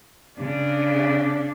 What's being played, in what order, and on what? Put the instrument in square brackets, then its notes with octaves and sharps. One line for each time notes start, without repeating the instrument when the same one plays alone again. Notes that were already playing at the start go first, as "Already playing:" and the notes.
[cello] C#3 [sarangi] D4